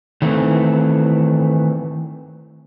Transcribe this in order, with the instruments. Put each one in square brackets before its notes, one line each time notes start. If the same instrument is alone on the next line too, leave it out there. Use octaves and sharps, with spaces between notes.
[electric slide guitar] D#3 E3 A3 C4